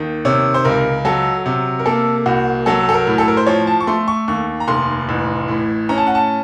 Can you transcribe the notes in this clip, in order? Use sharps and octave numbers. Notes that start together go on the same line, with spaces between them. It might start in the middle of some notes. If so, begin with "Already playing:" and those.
Already playing: D#2 D#3
C3 C#5
C5
C#2 A#4
F#3 A4
C3
A#4
A#3 A4
C2 F#4
F#3 A4
A4
A#4
A2
A4
A#4
C5
F3 C#5
A5
C#6
A3 C6
C#6
D#2 C#6
A#5
F1 C6
A1
A2
C#4 A#5
A5
F#5
A5